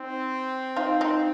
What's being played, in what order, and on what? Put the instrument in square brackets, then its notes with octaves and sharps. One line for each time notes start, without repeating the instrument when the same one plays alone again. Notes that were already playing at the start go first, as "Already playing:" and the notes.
Already playing: [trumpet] C4 [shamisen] D#4
[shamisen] D#4 F4
D#4 F4